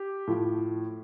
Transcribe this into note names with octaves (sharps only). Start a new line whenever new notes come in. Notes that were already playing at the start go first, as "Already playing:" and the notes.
Already playing: G4
A2 F3